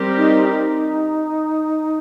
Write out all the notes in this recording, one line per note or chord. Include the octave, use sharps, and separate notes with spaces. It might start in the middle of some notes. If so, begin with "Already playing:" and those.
Already playing: G3 C4 G4 A#4
D#4
D#4